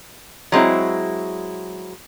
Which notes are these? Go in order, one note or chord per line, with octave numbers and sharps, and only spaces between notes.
F#3 G#3 C4 E4